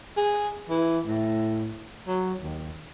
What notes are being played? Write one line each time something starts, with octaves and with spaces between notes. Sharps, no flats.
G#4
E3
A2
F#3
D#2